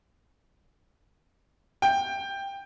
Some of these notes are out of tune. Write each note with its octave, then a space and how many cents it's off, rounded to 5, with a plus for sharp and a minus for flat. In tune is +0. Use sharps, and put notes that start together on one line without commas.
G5 +10